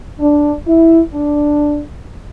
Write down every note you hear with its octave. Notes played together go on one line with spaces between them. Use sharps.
D4
E4
D4